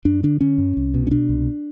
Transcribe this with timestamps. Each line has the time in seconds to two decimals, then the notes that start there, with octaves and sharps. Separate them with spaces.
0.05 F#2 D4
0.23 D3 D4
0.41 D3 C#4
0.58 F#2
0.77 C2
0.94 B2
1.07 C#4
1.11 B2 D4
1.29 C2